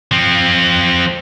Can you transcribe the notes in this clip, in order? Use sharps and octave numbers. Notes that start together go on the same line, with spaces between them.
F3 C4